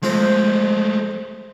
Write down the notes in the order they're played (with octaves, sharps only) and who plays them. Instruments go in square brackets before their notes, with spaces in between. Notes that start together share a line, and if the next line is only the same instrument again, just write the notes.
[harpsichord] F3 C4 C5 [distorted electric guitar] G#3 A3